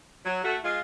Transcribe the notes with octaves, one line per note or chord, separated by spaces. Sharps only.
F#3
A3 F#4
G#3 F4